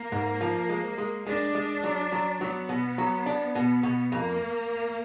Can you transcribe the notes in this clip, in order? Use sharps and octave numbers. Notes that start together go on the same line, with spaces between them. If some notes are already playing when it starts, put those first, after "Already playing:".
Already playing: A#3
G#2
F3
G#3
G#3
G#3 D4
G#3
F#3
F#3
F#3 B3
B2
F#3
D4
B2 B3
B2
F2 A#3